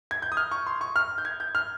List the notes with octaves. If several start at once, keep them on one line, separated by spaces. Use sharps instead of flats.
G#6
G6
D#6
F6
C#6
C6
C#6
F6
G6
G#6
G6
F6